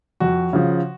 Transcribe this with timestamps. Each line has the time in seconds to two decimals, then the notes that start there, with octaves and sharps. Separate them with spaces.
0.20 F2 F#4
0.53 C#3 F3